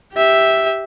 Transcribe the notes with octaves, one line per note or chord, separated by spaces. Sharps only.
G4 E5